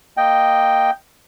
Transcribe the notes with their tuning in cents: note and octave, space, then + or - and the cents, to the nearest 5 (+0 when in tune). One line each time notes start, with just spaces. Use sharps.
A#3 +0 D#5 +0 G5 +0